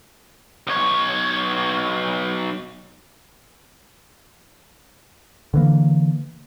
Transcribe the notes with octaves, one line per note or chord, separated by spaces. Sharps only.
B1 C#5
D3 E3 A#3